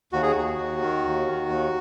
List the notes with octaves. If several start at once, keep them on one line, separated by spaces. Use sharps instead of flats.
D#2 F#4
G#4
D#2 F#4
D#2
D#3
D#2
D#3
D#2